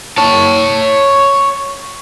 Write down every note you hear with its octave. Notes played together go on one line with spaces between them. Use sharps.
C#5 A5